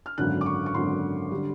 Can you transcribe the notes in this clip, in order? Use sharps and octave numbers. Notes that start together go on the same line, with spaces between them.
F6
G#1 F#2 D3 F#6
D6
C#6
C#6
G#1 F#2 D3 C6
D3 G3